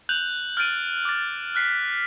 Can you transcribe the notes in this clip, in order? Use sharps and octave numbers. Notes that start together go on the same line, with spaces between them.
F#6 G6 F7 F#7
F6 G6 A6 D7 D#7
D6 A6
F6 F#6 B6 C7